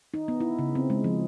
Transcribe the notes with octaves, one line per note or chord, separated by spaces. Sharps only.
D#4
B3
E4
C#3
C4
G#3
F3